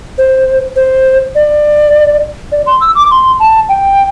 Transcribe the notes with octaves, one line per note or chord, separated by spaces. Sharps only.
C5
C5
D5
D5
C6
E6
D6
C6
A5
G5